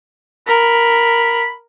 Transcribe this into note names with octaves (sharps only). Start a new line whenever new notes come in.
A#4 B5